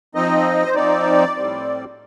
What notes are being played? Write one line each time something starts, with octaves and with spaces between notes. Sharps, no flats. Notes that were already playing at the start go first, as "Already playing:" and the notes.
F3 C4 D#4 D#5
C5
F3 C4 D#4 D5
A2 G3 C4